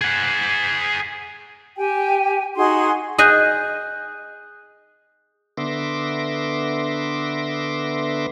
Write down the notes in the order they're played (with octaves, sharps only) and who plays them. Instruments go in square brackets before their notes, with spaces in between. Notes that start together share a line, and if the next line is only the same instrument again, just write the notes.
[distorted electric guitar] G#4 F#5
[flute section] G4 G5 G#5
D#4 F#4 G#4 C6
[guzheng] G#4 D#5 G#5 [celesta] D#6 F#6 G6
[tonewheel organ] D3 B3 E5 C6 D6 A#6